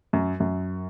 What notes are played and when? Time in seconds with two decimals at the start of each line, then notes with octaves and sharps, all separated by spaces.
0.13 F#2
0.40 F#2